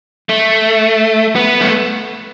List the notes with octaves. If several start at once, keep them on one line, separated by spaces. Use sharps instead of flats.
A3
B3
A3